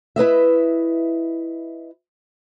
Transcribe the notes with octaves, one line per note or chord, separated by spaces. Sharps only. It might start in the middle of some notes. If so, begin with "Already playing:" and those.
E4 B4 D#5 E5